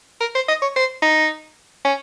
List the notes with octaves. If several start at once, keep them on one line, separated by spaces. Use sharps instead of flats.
A#4
C5
D#5
C#5
C5
D#4
C#4